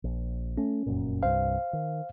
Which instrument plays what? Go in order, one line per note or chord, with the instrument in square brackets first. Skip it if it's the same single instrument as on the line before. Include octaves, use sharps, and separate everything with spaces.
[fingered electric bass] A#1
[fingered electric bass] A3 [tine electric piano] C#4
[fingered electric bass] F1 F#2 A#2
[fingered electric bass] C2 G2 [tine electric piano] C5 F5
[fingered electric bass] D#3